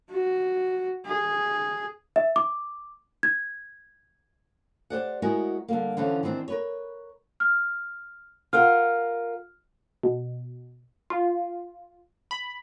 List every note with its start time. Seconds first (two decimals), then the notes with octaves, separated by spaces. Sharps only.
0.11 F#4
1.06 G#4
2.16 E5
2.36 D6
3.23 G#6
4.90 G4 C5 D5 F#5
5.22 G#3 B3 E4 F#4 A#4
5.68 D3 G3 A#3
5.97 D3 E3 F3 C#4
6.23 D#3 E3 C4 D4
6.48 A#4 B4 C#5
7.40 F6
8.53 F4 A#4 F#5 F6
10.03 B2
11.10 F4
12.31 B5